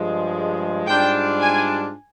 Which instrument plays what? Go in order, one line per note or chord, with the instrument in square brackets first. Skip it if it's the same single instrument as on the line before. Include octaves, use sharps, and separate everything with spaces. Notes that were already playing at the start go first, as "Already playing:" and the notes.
Already playing: [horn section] G2 F3 G#3
[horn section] G#2 G3 D4 F4 [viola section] G5
[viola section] G#5